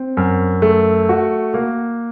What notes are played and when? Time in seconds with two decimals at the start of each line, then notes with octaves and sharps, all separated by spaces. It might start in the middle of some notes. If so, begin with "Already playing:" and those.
Already playing: C4
0.17 F#2
0.62 A3
1.09 F#4
1.54 A#3